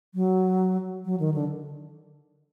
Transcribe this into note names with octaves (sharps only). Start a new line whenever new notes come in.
F#3
F#3
D#3
D3